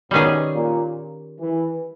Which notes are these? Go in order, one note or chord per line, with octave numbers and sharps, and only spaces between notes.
B2 D#3 G3 C#4 G#4
A#2
E3